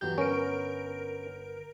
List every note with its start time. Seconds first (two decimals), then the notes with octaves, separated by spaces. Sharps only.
0.01 G1 E2 F#3 G4 G6
0.18 B3 C#4 A#4 D7